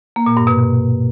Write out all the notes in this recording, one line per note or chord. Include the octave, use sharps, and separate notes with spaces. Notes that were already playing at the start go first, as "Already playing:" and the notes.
A#3
A#2
G2
B2